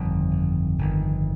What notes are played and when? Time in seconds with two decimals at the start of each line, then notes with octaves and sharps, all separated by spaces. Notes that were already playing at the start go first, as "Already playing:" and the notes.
Already playing: G1 F2 D#3
0.78 G1 F2 D#3